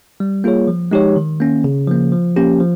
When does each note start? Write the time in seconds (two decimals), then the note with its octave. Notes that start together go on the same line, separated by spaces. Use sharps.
0.20 G3
0.44 A#3 F4 G#4 C#5
0.68 F3
0.91 G#3 D#4 G4 C#5
1.16 D#3
1.40 A#3 C#4
1.64 C#3
1.88 F3 A#3
2.12 F3
2.37 A#3 C#4 G4
2.60 F3